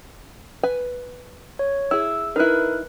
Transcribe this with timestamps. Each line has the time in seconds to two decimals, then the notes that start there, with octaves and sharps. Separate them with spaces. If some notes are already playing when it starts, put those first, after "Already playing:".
0.63 B4 G#5
1.59 C#5
1.91 E4 G#4 E6
2.36 D#4 E4 A#4 B4 F#6